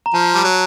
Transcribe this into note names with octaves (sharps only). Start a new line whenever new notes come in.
A#5
F3 A5
G3
F#3